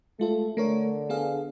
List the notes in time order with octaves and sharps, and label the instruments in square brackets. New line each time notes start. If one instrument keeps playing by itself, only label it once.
[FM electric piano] G#3 F4 A4 [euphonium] A3
[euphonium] D3 [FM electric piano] A3 A#4 C#5
[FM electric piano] B3 G#4 F5